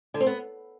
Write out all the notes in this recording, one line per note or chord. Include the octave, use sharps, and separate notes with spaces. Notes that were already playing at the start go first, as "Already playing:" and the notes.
D3
C4
B3